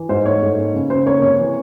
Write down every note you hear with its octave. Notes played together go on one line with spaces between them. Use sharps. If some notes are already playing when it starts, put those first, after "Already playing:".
Already playing: E3
G#2 C5
A3 C#5
G#2
A#3
C#3
C#3 C5
A#3 C#5
C3 C#5
E3